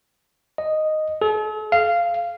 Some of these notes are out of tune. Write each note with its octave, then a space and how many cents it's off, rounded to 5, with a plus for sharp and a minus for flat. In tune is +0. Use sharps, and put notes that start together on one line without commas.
D#5 -5
A4 -45
F5 -15